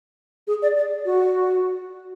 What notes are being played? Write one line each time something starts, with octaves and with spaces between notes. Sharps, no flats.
G#4
D5
D5
F#4